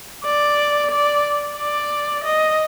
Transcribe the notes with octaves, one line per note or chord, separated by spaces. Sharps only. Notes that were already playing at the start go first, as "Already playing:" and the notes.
D5
D5
D5
D#5